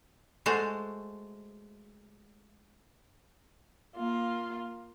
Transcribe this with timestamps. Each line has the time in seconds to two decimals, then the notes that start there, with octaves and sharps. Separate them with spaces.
0.46 G#3 A3 F#4 A4 C5
3.96 A#3 F4